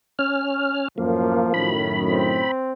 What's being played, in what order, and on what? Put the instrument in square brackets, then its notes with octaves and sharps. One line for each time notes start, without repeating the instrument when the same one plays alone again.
[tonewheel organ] C#4 F6
[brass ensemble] F#2 A2 [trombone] F3 [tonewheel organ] A#3
[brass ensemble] F#2 A2 D#3 [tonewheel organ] B5
[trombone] C4